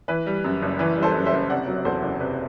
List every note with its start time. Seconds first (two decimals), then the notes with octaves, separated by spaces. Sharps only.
0.08 E3 B4
0.26 G3
0.44 F#2
0.62 F#1
0.79 E3 B4
0.97 G3
1.03 A4 C5
1.15 F#2
1.25 C5 E5
1.32 F#1
1.50 C3 D5 F#5
1.68 F#3
1.84 E2 A4 C5
2.02 F#1
2.20 C3 B4